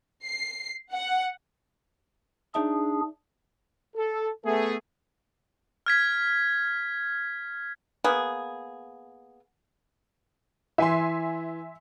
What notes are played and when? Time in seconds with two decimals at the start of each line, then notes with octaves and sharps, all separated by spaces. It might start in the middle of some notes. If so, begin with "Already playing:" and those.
0.25 C7
0.92 F#5
2.55 D4 D#4 G#4 D5 E5
3.96 A4
4.45 A3 B3 G#4
5.86 F6 G#6 B6
8.04 A#3 B3 G#4
10.78 E3 E5 G#5 C6